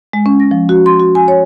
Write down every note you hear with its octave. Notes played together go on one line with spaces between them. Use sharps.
G#3
C#4
A#6
F3
F#4
C6
F#4
G#5
C#5